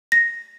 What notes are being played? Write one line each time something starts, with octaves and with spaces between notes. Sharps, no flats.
A#6